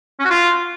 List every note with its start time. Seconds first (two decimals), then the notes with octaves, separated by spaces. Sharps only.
0.20 C#4
0.25 F#4
0.30 F4